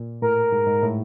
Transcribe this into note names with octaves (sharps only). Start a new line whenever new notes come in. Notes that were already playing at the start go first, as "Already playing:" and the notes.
Already playing: A#2
A2 A#4
G#2
G#2
A2